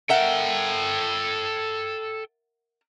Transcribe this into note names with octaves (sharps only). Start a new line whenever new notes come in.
A4 A#4 E5 F#5 G5